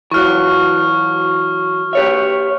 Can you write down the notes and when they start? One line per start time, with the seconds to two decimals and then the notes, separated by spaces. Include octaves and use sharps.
0.11 E3 F#3 C#6 F6
1.93 G4 C#5 E5